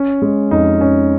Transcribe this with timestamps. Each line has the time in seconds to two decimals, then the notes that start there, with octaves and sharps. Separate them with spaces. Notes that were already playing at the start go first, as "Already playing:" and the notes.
Already playing: C#4
0.22 G#3
0.51 F2 D#4
0.81 C#4